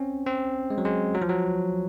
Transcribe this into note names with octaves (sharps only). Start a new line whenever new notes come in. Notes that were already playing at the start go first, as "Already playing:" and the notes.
Already playing: C4 C#4
C4
G#3
F#3
G#3
F#3
F3
F#3